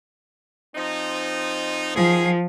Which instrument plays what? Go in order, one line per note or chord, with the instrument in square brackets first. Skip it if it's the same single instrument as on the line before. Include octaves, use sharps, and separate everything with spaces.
[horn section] F3 C4 D#4
[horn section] D#3 F#3 G#4 [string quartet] F3